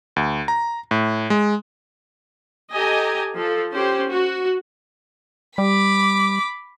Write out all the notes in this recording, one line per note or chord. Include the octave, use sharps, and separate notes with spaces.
D2
A#5
A2
G#3
G4 A4 D#5 G#5 A#5
F3 A4
C#4 G4 C5
F#4
G3 B5 D6